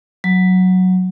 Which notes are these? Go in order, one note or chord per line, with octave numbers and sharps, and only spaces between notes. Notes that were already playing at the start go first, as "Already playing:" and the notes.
F#3